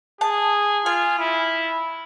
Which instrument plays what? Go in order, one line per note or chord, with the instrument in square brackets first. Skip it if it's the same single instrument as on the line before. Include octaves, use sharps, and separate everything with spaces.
[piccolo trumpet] G#4 [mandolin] A5
[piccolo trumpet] F4 [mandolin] G#5
[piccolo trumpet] E4